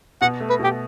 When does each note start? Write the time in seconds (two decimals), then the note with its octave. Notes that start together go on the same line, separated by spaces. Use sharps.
0.21 B2 F#5
0.40 A3
0.50 B4
0.60 B2 G4